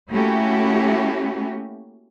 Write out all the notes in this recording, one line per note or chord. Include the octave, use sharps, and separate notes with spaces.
A3 A#3 C#4 E4 F#4 G4